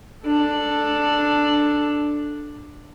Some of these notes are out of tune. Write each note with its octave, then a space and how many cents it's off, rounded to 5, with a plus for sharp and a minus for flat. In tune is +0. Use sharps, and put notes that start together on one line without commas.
D4 +5 A4 +0